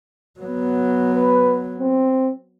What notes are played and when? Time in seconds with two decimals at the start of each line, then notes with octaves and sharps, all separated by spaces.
0.40 F#3 B3
1.14 B4
1.80 C4